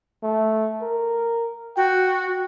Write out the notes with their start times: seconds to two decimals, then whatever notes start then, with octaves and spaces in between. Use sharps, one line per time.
0.23 A3
0.82 A#4
1.77 F#4 G5